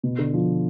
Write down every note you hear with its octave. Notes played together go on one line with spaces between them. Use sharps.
B2
D3
F3